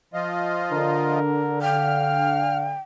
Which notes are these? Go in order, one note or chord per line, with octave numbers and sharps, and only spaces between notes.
F3 F4 D#5
D3 A#4
F5 G5 F6